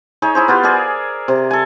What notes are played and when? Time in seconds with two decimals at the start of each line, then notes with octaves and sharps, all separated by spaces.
0.22 D#4 G#4 C#5 E5
0.35 E4 G#4 C5
0.48 B3 F4 G4
0.63 G#4 A#4 D5 E5
1.28 C3
1.51 A4 G#5